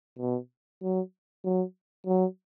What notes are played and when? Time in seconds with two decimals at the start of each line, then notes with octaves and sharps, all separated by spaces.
0.19 B2
0.82 F#3
1.44 F#3
2.07 F#3